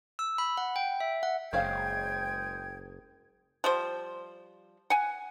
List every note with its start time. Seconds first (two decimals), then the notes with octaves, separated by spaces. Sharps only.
0.19 E6
0.38 B5
0.57 F#5
0.76 G5
1.00 E5
1.23 F#5
1.53 F#1 G#3 C4 C#4 G#4 F5 G5 G#6
3.64 F3 G3 C5
4.90 F#5 G#5